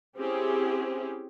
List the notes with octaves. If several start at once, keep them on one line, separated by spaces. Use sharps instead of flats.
C4 C#4 E4 G4 G#4